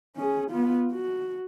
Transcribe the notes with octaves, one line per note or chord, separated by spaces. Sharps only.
C#4 G#4
B3 F4
F#4